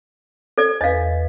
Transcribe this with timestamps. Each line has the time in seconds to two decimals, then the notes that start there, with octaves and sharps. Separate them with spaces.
0.58 A4 D5
0.81 E2 B4 D#5 F5